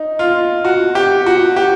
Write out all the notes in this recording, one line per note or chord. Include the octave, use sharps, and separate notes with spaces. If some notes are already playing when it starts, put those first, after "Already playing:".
Already playing: D#4
F4
F#4
G4
F#4
G4